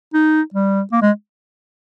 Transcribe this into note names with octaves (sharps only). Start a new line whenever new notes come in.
D#4
G3
A#3
G#3